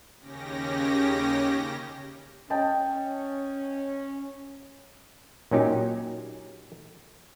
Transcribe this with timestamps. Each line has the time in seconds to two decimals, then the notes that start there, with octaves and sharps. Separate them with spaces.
0.20 D#2 C#3 C#4 G4 A#6
2.50 C#4 D#5 G5 A5
5.51 A#2 F#3 C#4 D#4 G4